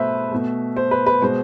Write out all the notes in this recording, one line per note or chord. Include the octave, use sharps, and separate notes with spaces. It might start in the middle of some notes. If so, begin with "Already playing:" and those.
Already playing: B2 A3 B4 C5 E5
B2 A3
C5
B4
B4
B2 G#3 C5